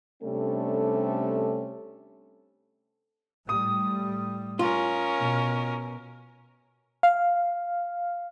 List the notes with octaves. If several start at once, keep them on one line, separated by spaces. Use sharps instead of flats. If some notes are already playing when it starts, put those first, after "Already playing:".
C3 G3 A3 C#4 D4 A4
A2 G3 D#6
C#4 F4 A#4
B2
F5